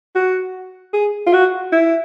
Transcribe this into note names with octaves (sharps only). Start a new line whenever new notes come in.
F#4
G#4
F4
F#4
E4